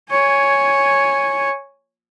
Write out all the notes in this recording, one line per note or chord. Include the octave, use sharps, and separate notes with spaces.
C#5 G#5